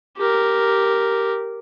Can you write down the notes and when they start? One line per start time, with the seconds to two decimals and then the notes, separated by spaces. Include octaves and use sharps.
0.17 G4 A#4